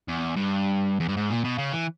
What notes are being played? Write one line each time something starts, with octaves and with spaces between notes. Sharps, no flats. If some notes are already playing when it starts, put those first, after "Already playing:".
E2
G2
E2
G2
G#2
A#2
B2
C#3
E3